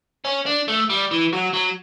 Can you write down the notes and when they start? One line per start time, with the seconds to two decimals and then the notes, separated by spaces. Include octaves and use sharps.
0.25 C#4
0.46 D4
0.68 A3
0.89 G3
1.11 E3
1.33 F#3
1.54 F#3